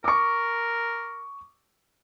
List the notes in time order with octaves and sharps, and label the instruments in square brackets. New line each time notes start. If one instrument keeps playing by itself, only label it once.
[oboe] A#4 [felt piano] C#6 D6